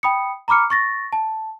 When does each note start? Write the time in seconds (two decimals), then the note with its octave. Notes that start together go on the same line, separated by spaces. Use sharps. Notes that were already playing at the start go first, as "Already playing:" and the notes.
0.03 G5 B5 D#6 C#7
0.48 A#5 B5 D6 F6 C#7
0.70 C#6 A6 A#6
1.13 A5